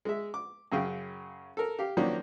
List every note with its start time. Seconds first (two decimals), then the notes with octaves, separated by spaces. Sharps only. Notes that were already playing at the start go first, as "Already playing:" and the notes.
0.05 G#3 E5
0.34 D6
0.72 F#2 C#3 F5 G5
1.57 A4 A#4
1.79 G4 F5
1.97 D#3 F3 F#3 A#3 C#4 D4